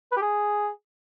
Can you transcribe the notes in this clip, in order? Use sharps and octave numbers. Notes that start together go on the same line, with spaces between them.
B4
G4
G#4